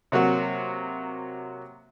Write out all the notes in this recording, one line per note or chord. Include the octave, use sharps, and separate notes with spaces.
C3 F#3 A#3 F#4